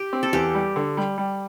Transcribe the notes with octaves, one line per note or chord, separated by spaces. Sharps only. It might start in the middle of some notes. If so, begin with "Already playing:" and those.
Already playing: G4
C4
A4
E2 G4
G3
D3
G3
G3